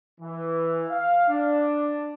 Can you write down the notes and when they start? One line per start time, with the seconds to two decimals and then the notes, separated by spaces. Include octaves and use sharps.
0.21 E3
0.89 F5
1.29 D4